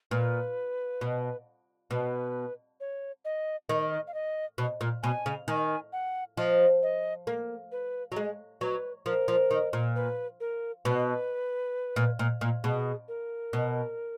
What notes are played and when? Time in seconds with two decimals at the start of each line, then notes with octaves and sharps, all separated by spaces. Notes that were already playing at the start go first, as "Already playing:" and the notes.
0.11 A#2 B4
1.01 B2
1.90 B2 B4
2.80 C#5
3.25 D#5
3.69 D#3 D#5
4.07 F5
4.14 D#5
4.58 B2
4.81 A#2
5.03 B2 G#5
5.26 C#3
5.48 D#3 G#5
5.93 F#5
6.37 F3 D#5
6.82 D#5
7.27 A#3
7.72 B4
8.12 F#3
8.16 G#3
8.61 F#3 B4
9.06 F3 A#4
9.28 F3
9.51 D#3
9.73 A#2
9.96 B4
10.40 A#4
10.85 B2 B4
11.96 A#2
12.19 A#2
12.41 A#2
12.64 B2 G#4
13.08 A#4
13.53 B2